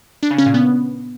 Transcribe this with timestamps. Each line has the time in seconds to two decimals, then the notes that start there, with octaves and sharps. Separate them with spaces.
0.23 D4
0.31 C#3
0.38 C#4
0.46 A#2
0.54 B3